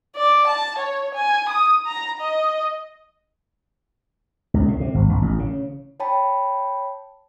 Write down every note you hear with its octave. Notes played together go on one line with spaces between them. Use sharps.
D5
A5
C#5
G#5
D#6
A#5
D#5
C#2
A2
C3
G#1
G#1
A1
C#3
C#5 G5 A5 B5